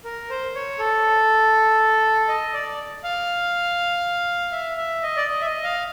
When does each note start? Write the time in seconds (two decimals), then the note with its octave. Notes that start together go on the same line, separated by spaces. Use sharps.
0.04 A#4
0.30 C5
0.55 C#5
0.79 A4
2.28 D#5
2.53 D5
3.04 F5
4.52 E5
4.77 E5
5.03 D#5
5.17 D5
5.28 D#5
5.41 E5
5.46 D#5
5.64 F5